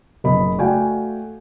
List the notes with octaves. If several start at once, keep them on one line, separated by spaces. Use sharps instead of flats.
F#1 D#5 B5
A3 F#4 D5 F5 G5 G#5